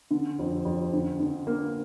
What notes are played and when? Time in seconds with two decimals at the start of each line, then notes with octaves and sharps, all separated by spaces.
0.11 D3
0.39 F2
0.65 F2
0.93 D3
1.19 D3
1.47 A#3